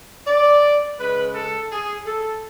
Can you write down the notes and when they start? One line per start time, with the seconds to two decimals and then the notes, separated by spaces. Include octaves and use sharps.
0.27 D5
0.99 C#3 G#3 C#4 B4
1.35 A4
1.72 G#4
2.07 A4